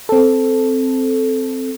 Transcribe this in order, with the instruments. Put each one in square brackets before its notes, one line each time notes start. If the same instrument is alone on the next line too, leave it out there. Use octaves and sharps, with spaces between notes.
[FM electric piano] C4 A4